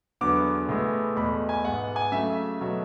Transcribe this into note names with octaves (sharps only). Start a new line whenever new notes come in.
E2 D3 F#3 B3 D6
A2 G#3 B3
E2 B2 A3 B5
G#5
G#2 G#3 B3 F#5
G#5
C#3 F#3 A3 E5
B2 F#3 A3